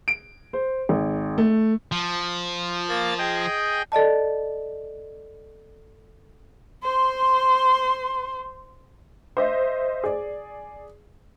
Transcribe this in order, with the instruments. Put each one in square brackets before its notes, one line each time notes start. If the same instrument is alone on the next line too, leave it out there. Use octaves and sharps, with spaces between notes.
[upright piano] D7
C5
G#1
A3
[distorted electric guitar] F3
[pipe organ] A#3 A6
G#4 D#5 G5
[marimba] A4 D5 D#5 A5
[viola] C5 C6
[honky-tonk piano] C5 D#5 E5
G#4 D5